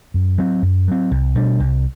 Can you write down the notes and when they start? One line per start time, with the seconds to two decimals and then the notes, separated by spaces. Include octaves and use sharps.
0.14 F#2
0.38 F#3 C4
0.62 F#2
0.87 F#3 C4
1.11 C2
1.35 B2 G3 D4
1.60 C2